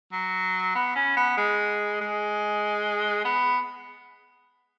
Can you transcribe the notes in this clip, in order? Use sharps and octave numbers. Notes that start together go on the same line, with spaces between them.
F#3
B3
C#4
B3
G#3
G#3
B3